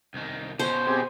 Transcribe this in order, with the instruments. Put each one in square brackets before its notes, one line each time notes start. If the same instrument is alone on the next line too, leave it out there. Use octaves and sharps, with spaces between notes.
[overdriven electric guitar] C2 D#3
[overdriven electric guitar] B2 C#4 [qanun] C5
[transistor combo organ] C4 G4 G#4